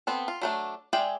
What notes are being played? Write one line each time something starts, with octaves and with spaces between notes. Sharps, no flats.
B3 C4 A4
F4
F#3 A3 D4
G#3 G#4 D5 E5 G5